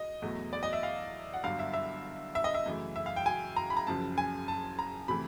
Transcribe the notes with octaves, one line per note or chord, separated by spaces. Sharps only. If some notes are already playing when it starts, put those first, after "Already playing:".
Already playing: D#5
E2 B2 F#3 A3
D5
D#5
E5
F5
F#5
G1 G2 D3 F#3 F5
E5
E5
E5
D#5
E5
F#2 C#3 E3 A3
E5
F5
G5
G#5
A#5
B5
A#5
F#1 F#2 C#3 F3 A5
G#5
A5
A#5
C3 E3 A3 B5